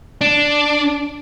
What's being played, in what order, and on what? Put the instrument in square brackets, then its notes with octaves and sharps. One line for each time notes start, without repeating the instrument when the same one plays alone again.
[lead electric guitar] D4